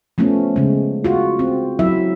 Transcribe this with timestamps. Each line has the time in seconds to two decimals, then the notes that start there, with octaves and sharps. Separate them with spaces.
0.18 F3 A3 B3 C#4
0.56 C#3 G#3
1.04 F4 F#4
1.39 C4
1.79 F#3 E4 E5